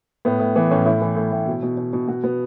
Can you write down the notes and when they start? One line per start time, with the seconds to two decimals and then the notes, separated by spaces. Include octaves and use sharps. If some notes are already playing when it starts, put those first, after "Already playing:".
0.25 A2 B3
0.40 A2
0.56 E3 B3
0.71 A2 C#4
0.86 A2 E4
1.02 E3
1.16 A2
1.32 A2
1.47 B2
1.63 B2
1.77 B2
1.93 B2
2.08 B2 F#4
2.24 B2 B3